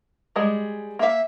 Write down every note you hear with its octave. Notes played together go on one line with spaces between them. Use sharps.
G3 G#3 G#4
A#3 E5 F5